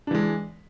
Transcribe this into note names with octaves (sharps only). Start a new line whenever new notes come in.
E3 G#3 D4